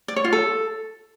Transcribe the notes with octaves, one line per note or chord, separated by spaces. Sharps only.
D5
C#5
F4
A4